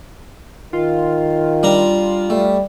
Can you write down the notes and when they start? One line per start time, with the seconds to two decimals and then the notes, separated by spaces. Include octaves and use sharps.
0.73 D#3 F4
1.63 G3 D4 A#5
2.30 G3 A3